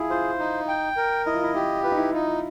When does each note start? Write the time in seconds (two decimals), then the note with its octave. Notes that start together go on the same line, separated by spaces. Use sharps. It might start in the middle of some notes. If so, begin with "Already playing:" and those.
Already playing: E4 F4 G#4
0.10 F4 C5
0.39 D#4
0.68 G5
0.97 A#4
1.26 E4 D#5
1.34 F4
1.43 E4
1.54 E4 G4
1.84 F4 B4
1.92 D#4
1.98 E4
2.12 D#4 F4
2.27 F4